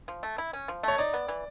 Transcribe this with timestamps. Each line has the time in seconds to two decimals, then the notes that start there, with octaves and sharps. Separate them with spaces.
0.08 F3
0.23 A3
0.38 E4
0.53 C#4
0.68 F3
0.83 A3 C#5
0.98 D#4 D5
1.14 B3
1.28 E3